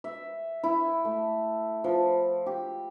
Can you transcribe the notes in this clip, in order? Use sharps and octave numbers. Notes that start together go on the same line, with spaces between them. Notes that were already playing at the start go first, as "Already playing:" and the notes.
E5
E4
A3
F3
G4